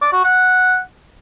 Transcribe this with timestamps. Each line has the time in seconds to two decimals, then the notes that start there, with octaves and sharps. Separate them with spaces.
0.01 D5
0.13 F#4
0.24 F#5